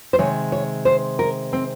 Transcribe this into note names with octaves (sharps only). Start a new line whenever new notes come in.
C5
C3 D#3 G#3 C#5
C#5
C5
A#4
C4